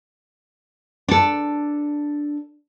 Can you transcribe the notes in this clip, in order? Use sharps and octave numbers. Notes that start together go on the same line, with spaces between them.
D4 A4